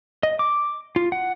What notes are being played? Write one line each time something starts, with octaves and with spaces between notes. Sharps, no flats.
D#5
D6
F4
F#5